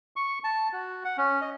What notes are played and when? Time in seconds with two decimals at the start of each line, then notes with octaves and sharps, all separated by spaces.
0.16 C#6
0.44 A5
0.73 F#4
1.04 F#5
1.17 C#4
1.41 D#5